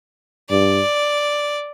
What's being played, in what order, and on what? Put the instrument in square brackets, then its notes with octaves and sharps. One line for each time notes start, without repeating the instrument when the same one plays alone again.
[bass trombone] G2 [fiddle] D5